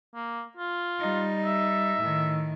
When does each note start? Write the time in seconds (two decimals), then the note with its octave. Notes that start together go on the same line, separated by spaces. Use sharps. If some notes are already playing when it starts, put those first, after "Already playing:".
0.15 A#3
0.57 F4
0.99 G3 D#4
1.45 E5
2.00 A2 D#3